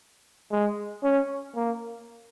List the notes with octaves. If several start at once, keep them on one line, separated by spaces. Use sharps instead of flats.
G#3
C#4
A#3